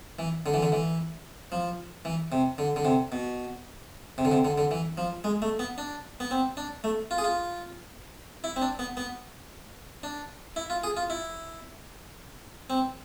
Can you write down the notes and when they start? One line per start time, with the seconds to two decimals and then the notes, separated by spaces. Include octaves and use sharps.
0.19 E3
0.46 D3
0.54 E3
0.63 D3
0.72 E3
1.52 F3
2.05 E3
2.32 C3
2.58 D3
2.76 D3
2.85 C3
3.12 B2
4.18 C3
4.25 D3
4.32 C3
4.45 D3
4.58 D3
4.71 E3
4.97 F3
5.24 G#3
5.42 A3
5.59 B3
5.78 D4
6.20 B3
6.31 C4
6.57 D4
6.84 A3
7.11 F4
7.18 G#4
7.24 F4
8.44 E4
8.56 C4
8.62 D4
8.79 B3
8.97 B3
10.03 D4
10.56 E4
10.70 F4
10.84 G#4
10.97 F4
11.10 E4
12.70 C4